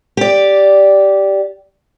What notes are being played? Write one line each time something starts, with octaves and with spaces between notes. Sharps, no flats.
G4 D5